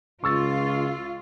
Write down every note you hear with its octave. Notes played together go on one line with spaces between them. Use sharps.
C#2 F4 C#6 E6 A6